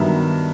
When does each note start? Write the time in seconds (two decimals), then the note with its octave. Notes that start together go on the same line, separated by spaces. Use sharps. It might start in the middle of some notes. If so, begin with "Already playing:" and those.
Already playing: G2 D#3 F#3 B3 E5